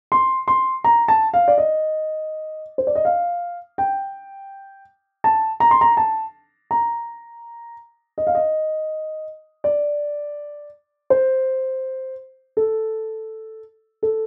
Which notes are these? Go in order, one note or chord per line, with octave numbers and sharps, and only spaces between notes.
C6
C6
A#5
A5
F5
D5
D#5
C5
D5
D#5
F5
G5
A5
A#5
C6
A#5
A5
A#5
D#5
F5
D#5
D5
C5
A4
A4